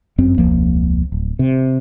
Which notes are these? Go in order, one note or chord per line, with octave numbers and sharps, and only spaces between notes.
G1 F#2 C4
E1 C#2 F3 A#3
D1
C3